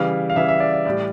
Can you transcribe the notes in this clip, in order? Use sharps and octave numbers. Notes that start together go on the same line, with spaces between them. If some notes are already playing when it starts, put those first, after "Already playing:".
Already playing: C#3 E3 G3 F5
F5
C#3 E3 G3 E5
E5
D5
D5
A2 G3 D5